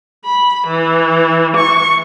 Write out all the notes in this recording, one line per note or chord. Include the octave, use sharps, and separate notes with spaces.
B5
E3
C#6